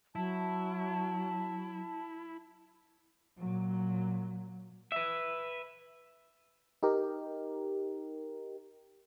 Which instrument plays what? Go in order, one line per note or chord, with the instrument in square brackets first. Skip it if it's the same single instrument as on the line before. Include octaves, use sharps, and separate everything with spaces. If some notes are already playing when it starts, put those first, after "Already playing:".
[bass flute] F#3 [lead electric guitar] E4 [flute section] A5
[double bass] A#2 F#3
[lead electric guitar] B4 E5
[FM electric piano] D#4 G4 A#4